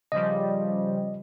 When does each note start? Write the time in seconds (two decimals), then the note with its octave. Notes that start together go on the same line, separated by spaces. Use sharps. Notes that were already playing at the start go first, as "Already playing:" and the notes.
0.12 C#3 F3 G3 D#5